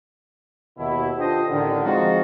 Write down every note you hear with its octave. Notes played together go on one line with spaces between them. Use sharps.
D#2 B2 E4
D4 F4 G4 A4 C5 D#5
A1 D3 D#3
F3 G#3 C4 D#4 F4 F#4